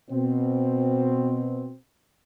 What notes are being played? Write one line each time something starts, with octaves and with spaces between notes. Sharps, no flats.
B2 C4